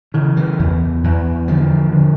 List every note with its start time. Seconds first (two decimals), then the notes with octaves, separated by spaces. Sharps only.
0.14 C#3 E3
0.37 E3
0.59 E2
1.04 E2
1.47 D3 F3
1.92 D3